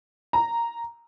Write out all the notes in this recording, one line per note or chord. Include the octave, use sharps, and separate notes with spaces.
A#5